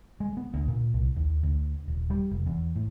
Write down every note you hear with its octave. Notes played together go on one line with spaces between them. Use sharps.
G#3
B3
D2
A#2
C2
D#2
D2
D#1
G3
F1
E2
A2